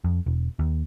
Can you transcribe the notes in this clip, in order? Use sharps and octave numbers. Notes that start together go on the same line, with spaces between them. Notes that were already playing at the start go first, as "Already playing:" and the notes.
F2
E1
D#2